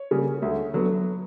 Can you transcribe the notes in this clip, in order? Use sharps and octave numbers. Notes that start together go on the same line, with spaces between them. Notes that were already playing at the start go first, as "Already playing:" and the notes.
Already playing: C#5
C#3 G3 A#3
D2
D3 F#3 B3